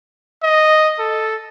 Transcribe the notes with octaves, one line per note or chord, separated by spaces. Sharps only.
D#5
A4